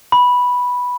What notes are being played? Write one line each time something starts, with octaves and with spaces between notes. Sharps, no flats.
B5